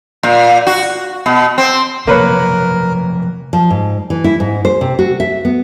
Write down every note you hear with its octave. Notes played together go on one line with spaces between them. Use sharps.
A#2
F#4
B2
C4
C3 F3 F#3 A#3 A#4 B4 C#5
F3
G#2
E3
E4
G#2
C5
C3
F#4
E5
B3